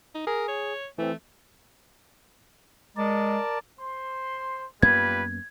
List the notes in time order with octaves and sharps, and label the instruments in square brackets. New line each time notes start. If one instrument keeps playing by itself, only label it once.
[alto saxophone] D#4
[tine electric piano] G#4 [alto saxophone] A#4
[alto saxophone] C#5
[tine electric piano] E3 C4 [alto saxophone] A3
[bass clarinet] G#3 [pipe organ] A#4 D5 A5
[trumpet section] C5 C6
[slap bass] F#2 A#3 B3 [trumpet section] G3 F4 B4 [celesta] G#6